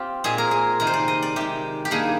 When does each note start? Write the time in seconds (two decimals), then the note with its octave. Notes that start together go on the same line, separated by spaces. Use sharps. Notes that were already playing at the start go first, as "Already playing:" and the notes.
Already playing: C4 F4 G4
0.24 A#2 G#3 C4 G#4
0.38 A#4
0.51 G#4
0.80 C3 D#3 G#3 A#4
0.87 C5
0.94 D5
1.08 D#5
1.22 D5
1.36 C3 D#3 G#3 G4
1.85 G4
1.91 G2 D#3 A#3 G#4